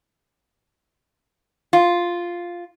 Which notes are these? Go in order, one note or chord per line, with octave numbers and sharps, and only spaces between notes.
F4